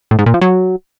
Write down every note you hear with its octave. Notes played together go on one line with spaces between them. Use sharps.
A2
G#2
A#2
F3
F#3